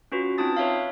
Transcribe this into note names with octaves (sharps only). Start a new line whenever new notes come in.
C#4 F4 F#4 B4
C4 D#4 F4 A5 D#6 A6
B4 C#5 E5 F5